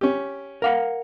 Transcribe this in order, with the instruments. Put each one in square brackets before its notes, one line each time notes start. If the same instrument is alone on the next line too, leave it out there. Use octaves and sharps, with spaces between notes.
[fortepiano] C#4 G4
[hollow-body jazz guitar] A#4 F5 F#5